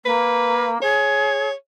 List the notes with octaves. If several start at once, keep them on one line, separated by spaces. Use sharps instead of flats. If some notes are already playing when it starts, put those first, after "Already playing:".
A#3 B4
G#4 C#5